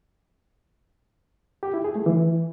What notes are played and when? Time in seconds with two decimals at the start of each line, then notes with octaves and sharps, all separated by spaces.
1.63 G4
1.74 E4
1.84 G#4
1.95 A3
2.06 E3